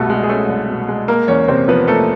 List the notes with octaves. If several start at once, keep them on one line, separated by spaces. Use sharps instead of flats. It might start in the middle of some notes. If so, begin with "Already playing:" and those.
Already playing: C2 B2 G3 A3 A4
G#3
G#4
A3 C#4 A4
C2
B2
G#3
A#3 A#4
E2 C#4 C#5
C3 C4 C5
F3 B3 B4
A3 A#3 A4